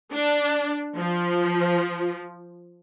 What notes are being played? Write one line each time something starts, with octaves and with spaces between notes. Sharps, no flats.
D4
F3